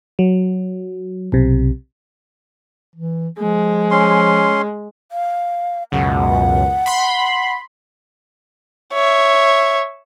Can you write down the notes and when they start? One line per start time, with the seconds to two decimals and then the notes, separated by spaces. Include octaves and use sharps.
0.19 F#3
1.32 B1 C3
2.96 E3
3.40 F3 G#3
3.91 C#4 C6
5.12 F5
5.92 C#2 F#2 B2 F#5
6.86 B5 C6
8.93 C#5 E5